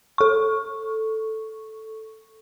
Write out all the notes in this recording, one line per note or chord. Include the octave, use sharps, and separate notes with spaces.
A4 C#6